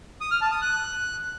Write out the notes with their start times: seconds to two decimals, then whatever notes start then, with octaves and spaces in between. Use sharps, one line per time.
0.21 D#6
0.31 F6
0.41 A5
0.52 D#6
0.62 F#6